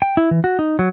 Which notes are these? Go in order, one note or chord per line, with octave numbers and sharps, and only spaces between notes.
G5
E4
E3
F#4
D#4
F#3